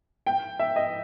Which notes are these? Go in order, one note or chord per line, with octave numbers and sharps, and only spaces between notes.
G5
E5
D#5